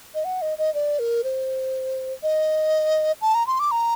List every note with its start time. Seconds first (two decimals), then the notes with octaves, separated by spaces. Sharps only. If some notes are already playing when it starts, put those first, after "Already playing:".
0.15 D#5
0.25 F#5
0.42 D#5
0.58 D#5
0.74 D5
0.99 A#4
1.24 C5
2.23 D#5
3.21 A5
3.35 A#5
3.47 C6
3.60 D6
3.71 A#5